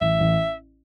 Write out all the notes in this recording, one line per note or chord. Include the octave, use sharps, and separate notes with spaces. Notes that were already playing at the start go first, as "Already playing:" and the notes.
A1 E5
A1